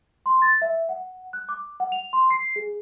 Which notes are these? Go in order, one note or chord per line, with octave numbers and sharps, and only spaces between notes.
C6
A6
E5
F#5
F#6
D6
F#5
F7
C6
C7
G#4